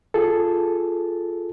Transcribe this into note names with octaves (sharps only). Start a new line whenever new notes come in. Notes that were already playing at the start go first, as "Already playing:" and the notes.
F4 G#4 A4